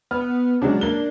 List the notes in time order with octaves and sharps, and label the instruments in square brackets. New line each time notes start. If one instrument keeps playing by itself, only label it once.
[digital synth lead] B3 [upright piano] F6
[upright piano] C#3 F#3 G#3 [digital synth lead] D4
[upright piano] A#3 G7